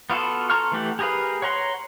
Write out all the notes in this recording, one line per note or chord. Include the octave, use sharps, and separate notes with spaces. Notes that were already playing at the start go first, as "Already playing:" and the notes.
B3 F4 F#4 A4
A4 A#5 C6 C#6 F6
E3 A3 G4 F#5
G4 G#4 A#4 B4 F5
C#5 F#5 A#5 C6